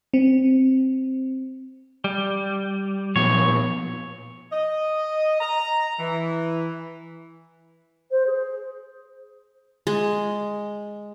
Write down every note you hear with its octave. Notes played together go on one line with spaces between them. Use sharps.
C4
G3
A#2 F3 B3 C#5
D#5
A#5
E3
C5
G#4
G#3